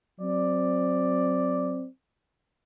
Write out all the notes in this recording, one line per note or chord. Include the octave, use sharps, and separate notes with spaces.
F#3 C4 D5